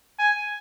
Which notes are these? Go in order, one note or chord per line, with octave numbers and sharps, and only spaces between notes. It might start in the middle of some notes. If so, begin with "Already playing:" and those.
G#5